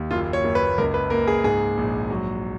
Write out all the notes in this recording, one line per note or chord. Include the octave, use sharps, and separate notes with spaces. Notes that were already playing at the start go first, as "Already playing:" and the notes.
Already playing: D#2
F#1 F4
C#5
F#1
B4
C#2 A#4
B4
A#3 A#4
G#4
G#2 G#4
A#1
F#3